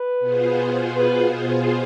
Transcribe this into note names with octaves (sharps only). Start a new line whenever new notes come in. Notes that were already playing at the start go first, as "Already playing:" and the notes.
Already playing: B4
B2 B3 F4 G#4 C5
B4